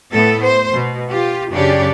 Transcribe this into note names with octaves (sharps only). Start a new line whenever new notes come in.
A2 A3 B3 A4
C5
B2
F4 G4
F#2 C#3 D4 G4 C#5 D5